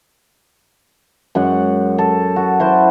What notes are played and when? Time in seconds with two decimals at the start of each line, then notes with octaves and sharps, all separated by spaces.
1.35 F#2 G#3 F#5
1.98 A4
2.36 F#4
2.60 E4 F#4 C5